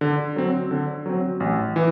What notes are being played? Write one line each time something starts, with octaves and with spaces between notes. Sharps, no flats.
D3
F#3 C4
D3
F#3 C4
A1
E3